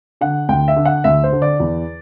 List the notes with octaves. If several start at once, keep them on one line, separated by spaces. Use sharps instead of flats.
D3 F#5
D2 G5
E5
D3
F#5
D2 E5
C5
D3
D5
E2